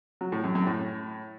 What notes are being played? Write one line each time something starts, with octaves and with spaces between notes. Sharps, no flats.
F#3
A2
F#2
F#2
A2